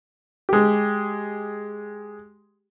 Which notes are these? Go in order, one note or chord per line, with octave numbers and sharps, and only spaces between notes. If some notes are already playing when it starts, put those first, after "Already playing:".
G#3 G4